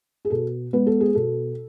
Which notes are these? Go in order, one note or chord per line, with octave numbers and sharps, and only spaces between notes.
G#4
B2 A4
G#3 B3 B4
A4
G#4
B2 A4